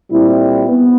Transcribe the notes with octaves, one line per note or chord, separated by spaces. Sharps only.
A#2 G3 C4 E4
B3